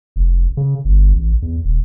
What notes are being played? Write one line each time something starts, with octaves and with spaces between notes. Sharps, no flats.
F1
C#3
G1
A1
E2
D#1